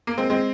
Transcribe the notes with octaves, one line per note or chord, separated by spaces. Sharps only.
A#3
G#3 C4
G#3 C4